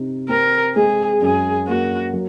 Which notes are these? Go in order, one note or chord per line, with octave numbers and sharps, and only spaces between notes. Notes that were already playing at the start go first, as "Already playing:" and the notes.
Already playing: C3 D#4
C4 A#4
G#3 G#4
F#2 G#4
A#3 F#4
F#3